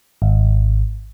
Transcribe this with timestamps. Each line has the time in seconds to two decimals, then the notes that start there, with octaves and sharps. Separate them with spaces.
0.22 G#1